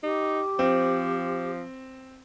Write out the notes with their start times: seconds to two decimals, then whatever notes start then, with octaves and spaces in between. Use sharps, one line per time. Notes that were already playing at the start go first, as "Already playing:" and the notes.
0.03 D#4 G4
0.59 F3 C4